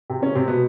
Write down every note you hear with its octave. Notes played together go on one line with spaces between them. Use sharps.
C3 C4
C#3 C#4
C3 C4
B2 B3